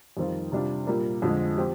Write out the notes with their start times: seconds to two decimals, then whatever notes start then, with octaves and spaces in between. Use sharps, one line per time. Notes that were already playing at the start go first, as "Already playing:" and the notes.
0.17 F2 D#3 G3 C4 F4
0.52 C3 G3 D4 F4
0.87 A#2 G3 A#3
1.22 F2 D3 F3 G#3
1.57 F3 C4 G4